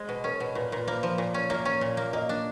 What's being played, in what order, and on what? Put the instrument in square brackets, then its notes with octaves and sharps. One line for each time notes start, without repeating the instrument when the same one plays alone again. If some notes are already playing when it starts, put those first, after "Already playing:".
Already playing: [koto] G#3 [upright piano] C5
[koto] B2
[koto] C#4 [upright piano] A#4
[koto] B2
[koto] A#2 [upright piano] B4
[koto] A#2 [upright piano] B4
[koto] A#3 [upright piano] C5
[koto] F3
A#2
C#4
[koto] A#3 [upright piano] C#5
[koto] C#4
A#2
A#3
[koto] A#3 [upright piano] D#5
[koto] D4